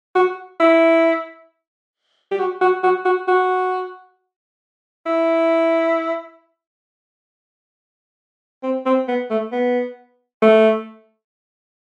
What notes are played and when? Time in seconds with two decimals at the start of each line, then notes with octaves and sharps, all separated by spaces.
0.15 F#4
0.60 E4
2.31 G4
2.39 F#4
2.61 F#4
2.83 F#4
3.05 F#4
3.27 F#4
5.06 E4
8.63 C4
8.86 C4
9.08 B3
9.30 A3
9.52 B3
10.42 A3